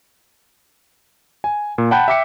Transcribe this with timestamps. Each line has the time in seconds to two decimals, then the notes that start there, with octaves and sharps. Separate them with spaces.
1.44 G#5
1.78 A#2
1.91 F#5 G5 A5 B5 F#6 G6
2.08 E5 G5 D6 B6 C#7